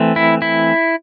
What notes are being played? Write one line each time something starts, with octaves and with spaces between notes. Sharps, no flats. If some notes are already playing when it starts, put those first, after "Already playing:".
Already playing: E3 A3 C4
E4
E4